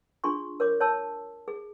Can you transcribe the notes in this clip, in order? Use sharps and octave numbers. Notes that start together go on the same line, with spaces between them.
D4 F4 G#4 C6 C#6
A#4 C#5 D6
C#5 A5 E6
G#4